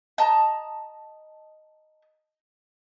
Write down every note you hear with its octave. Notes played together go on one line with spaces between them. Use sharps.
D#5 A5 A#5